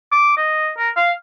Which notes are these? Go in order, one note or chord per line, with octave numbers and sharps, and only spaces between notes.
D6
D#5
A#4
F5